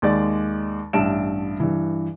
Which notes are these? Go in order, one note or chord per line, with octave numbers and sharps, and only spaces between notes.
D#2 G#3 D5 A6
A1 G2 E5 A5 D7 E7
G2 E3